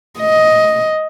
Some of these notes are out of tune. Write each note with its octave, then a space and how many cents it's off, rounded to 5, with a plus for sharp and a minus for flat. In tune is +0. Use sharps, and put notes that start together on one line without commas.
D#5 +10